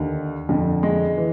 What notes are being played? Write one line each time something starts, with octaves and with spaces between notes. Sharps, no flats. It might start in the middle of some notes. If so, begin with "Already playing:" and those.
Already playing: D#2 D3
F2 D3
G#3
E3